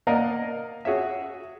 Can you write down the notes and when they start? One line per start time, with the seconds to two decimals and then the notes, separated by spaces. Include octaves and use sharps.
0.07 A#3 A#4 D5 D#5 F5 F#5
0.85 F#4 G#4 C#5 E5